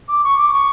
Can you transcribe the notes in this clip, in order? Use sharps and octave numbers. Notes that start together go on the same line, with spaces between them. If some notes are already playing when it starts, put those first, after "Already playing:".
D6
C#6
D6
C#6